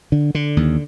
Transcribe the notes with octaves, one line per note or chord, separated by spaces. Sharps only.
D3
D3
D#2